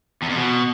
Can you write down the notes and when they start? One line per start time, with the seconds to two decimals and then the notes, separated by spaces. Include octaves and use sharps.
0.23 E2
0.30 F2
0.37 B2